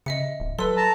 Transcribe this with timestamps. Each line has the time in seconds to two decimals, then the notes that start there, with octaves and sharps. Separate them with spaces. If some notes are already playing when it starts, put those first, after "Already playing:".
0.06 C#3 D#5 E5 C#7
0.40 D1
0.59 F#3 A4 B4 C6 E6
0.77 A5 A#5